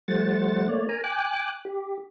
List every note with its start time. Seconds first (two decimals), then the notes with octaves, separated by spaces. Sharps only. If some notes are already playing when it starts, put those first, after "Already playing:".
0.08 F3 G3 A3 C5 F#5 A6
0.68 A3 A#3 C#5 D5
0.89 A#4 G#5 A#5
1.04 G5 G#5 D6 F#6
1.65 G4